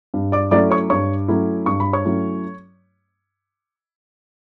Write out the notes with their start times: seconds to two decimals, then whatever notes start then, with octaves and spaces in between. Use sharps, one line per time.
0.14 G2
0.32 D5 D6
0.51 F#3 A3 C#4 E4 D5 D6
0.70 C#5 C#6
0.90 G2 C#5 C#6
1.28 F#3 A3 C#4 E4
1.66 G2 C#6
1.80 B5
1.93 C#5 C#6
2.05 F#3 A3 C#4 E4